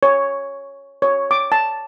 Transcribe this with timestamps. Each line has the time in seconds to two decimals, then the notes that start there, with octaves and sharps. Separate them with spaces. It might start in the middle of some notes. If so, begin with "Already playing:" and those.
0.03 C#5
1.02 C#5
1.31 D6
1.52 A5